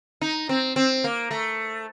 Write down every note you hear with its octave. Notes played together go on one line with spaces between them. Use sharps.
D#4
C4
C4
A#3
A3